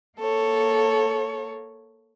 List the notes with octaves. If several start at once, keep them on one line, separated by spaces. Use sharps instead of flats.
A#3 A4 C#5